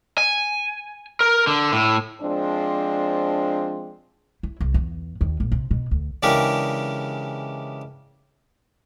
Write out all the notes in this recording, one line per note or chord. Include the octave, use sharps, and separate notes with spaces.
G#5
A#4
D3
A2
F3 G#3 C4 D4
E4
C2
E2
D#2
A#1
C3
B2
D2
C#3 E3 G#3 D4 G4 A#4